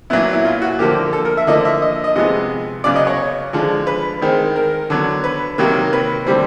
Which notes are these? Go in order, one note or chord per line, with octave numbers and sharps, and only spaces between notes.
A#2 F#3 B3 E4
E4
F4
F#4
D3 F3 A#3 G4
A4
A#4
E5
D3 F3 A#3 D#5
E5
D#5
D#5
C3 F3 G#3 B3 D#5
C#3 F#3 B3 D5
D#5
C#5
D3 F3 G#3
B4
D#3 G#3 C4
A#4
D3 F#3 B3
B4
C3 D#3 F#3 A#3
B4
D3 G3 C4